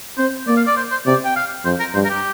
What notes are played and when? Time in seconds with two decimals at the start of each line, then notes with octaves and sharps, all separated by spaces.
0.17 C4 C5
0.47 A#3 D5
0.57 F5
0.67 D5
0.76 C5
0.91 C5
1.06 C3 D5
1.25 G5
1.36 F5
1.65 F2 C5
1.80 A#4
1.94 G2 C5
2.05 A#4
2.10 G4